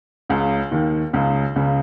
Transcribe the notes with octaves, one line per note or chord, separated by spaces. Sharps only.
C#2 C#3
D#2 D#3
C#2 C#3
C#2 C#3